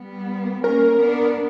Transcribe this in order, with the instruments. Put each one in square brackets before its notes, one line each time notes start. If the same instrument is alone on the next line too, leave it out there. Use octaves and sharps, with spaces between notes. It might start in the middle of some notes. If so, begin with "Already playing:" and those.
Already playing: [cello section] G3 B3
[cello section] A#3 C#4 [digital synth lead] A#4
[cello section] B3 D4